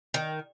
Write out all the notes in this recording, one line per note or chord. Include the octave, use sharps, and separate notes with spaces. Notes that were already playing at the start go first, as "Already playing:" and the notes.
D#3